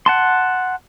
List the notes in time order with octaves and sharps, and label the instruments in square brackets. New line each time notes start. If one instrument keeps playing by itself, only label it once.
[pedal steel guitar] F#5 A5 C6